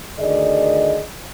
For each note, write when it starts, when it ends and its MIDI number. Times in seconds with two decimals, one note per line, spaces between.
0.19 1.02 38
0.19 1.02 51
0.19 1.02 68
0.19 1.02 74
0.19 1.02 75